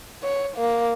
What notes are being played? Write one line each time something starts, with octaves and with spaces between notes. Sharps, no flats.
C#5
A#3